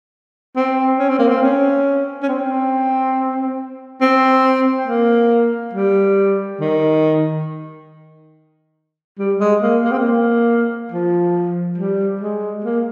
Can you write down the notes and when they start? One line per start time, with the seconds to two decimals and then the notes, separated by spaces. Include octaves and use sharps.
0.56 C4
0.99 C#4
1.09 C4
1.19 A#3
1.28 C4
1.43 C#4
2.23 C#4
2.28 C4
4.01 C4
4.87 A#3
5.74 G3
6.60 D#3
9.19 G3
9.40 G#3
9.62 A#3
9.84 A#3
9.92 C4
9.99 A#3
10.92 F3
11.78 G3
12.21 G#3
12.65 A#3